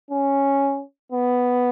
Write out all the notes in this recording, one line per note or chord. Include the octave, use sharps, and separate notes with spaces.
C#4
B3